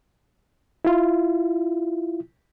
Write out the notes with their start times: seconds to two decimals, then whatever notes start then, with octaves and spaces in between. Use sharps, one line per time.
0.85 E4 F4